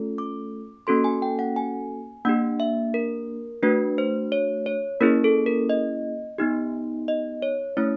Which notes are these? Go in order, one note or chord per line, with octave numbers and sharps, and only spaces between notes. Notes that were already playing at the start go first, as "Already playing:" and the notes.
Already playing: A3 C#4 F4 A4
D6
A#3 C#4 F#4 A4 C6
G#5
G5
F#5
G#5
A#3 D4 G4 F#5
E5
A#4
A3 D4 F#4 B4
C5
C#5
C#5
A#3 C#4 E4 G#4 A#4
A4
A#4
D#5
B3 D#4 G4
D#5
C#5
A3 C#4 E4 C#5